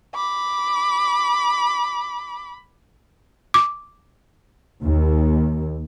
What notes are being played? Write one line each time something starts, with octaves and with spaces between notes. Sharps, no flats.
B5 D6
D6
D#2